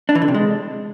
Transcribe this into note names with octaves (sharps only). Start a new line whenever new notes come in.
D4
E3
D3
C3
G#3